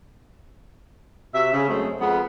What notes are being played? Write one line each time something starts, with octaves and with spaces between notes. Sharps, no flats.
C3 F#4 E5
C#3
F#2 G#3 A3 C4 C#4
F2 G#3 B3